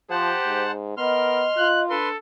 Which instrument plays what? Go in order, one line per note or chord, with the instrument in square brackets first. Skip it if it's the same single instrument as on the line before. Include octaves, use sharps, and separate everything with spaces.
[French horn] F3 [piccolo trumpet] G4 [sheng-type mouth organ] C5 F#5 A5
[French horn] G#2
[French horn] B3 [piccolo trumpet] A#4 [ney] D#5 [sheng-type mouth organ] C6 F6
[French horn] F4 [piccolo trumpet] F#6
[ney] D4 [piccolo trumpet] A4 [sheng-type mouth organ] B4 C6